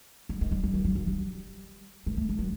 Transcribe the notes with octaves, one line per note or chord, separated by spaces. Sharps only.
G3
G#3
G3
G3
F#3
F#3
F#3
G3
G#3
A3
G#3
F#3